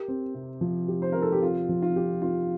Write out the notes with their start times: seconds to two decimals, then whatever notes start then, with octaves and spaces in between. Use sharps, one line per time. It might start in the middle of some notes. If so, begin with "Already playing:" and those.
Already playing: G4 A#4
0.08 C4
0.35 C3
0.61 F3
0.88 G4
1.02 C5
1.12 C4 A#4
1.22 A4
1.32 G4
1.41 C3 F4
1.69 F3
1.82 F4
1.96 G4
2.22 C4 F4